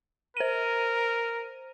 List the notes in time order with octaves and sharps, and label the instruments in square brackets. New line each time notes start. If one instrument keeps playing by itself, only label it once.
[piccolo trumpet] A#4 [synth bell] C5 D#7